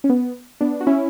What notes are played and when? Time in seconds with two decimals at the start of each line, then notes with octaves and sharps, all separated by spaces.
0.04 C#4
0.09 B3
0.61 B3 D4
0.81 F#4
0.87 C#4 E4